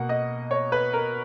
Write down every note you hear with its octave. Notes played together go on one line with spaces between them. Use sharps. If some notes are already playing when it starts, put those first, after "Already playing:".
Already playing: B2 A#3 F#5
D#5
C#5
B4
A#4